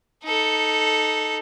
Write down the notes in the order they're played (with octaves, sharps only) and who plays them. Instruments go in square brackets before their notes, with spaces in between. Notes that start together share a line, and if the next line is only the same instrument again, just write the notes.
[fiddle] D#4 A4